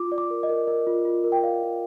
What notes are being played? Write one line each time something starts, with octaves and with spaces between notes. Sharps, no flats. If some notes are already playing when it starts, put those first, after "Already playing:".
Already playing: F4 D6
D5
D6
A#4
D#5
A#4
A#4 D#5
F4
F4
A#4
G5
D5 F5
F4